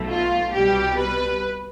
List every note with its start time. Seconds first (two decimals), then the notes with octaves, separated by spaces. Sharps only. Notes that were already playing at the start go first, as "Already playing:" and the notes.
Already playing: B1 B2 A3
0.09 F4
0.53 C2 B2 G3 G4
0.98 B4